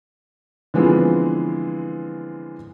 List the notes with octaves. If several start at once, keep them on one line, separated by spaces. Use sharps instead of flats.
D3 E3 F3 G#3 B3 C4